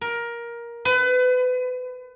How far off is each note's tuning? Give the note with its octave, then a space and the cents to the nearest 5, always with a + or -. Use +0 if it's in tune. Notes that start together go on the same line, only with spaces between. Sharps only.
A#4 +15
B4 +30